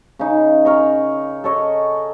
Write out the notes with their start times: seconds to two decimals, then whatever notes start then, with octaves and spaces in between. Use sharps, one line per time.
0.19 C#3 D#4
0.65 A#4 C#5 D#5
1.44 A4 C#5 D#5